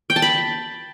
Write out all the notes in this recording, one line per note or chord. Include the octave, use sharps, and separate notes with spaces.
G5
A5
B5